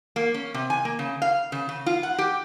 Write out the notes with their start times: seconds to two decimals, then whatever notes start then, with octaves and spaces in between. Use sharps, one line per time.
0.16 A#3
0.34 C#4
0.54 C3
0.70 G#5
0.85 A#3
0.99 C#3
1.22 F5
1.52 C#3
1.69 C#3
1.86 F4
2.03 F#5
2.18 G4